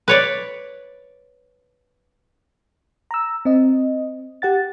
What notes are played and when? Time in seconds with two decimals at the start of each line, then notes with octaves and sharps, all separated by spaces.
0.08 B4 C#5 D5
3.11 A#5 E6
3.45 C4 D#5
4.42 G4 F#5 A6